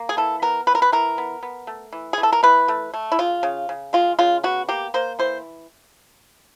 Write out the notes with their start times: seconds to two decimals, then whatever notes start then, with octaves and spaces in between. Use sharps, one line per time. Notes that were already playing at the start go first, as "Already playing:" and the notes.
Already playing: A#3
0.09 G#4
0.17 E3 A4
0.42 B3 A#4
0.67 E3 B4
0.75 A#4
0.82 B4
0.92 E3 A#4
1.18 B3
1.43 B3
1.67 A3
1.93 E3
2.13 G#4
2.18 E3
2.23 A4
2.32 A#4
2.43 E3 B4
2.68 A3
2.94 A3
3.12 E4
3.19 C#3 F4
3.43 C#3
3.69 C#3
3.93 G#3 F4
4.19 C#3 F4
4.43 B3 F#4
4.69 A#3 G4
4.94 A#3 C5
5.19 E3 C5